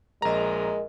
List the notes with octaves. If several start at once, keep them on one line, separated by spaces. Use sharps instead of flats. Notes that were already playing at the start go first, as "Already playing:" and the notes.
A#1 G#3 A#4 D#5 A#5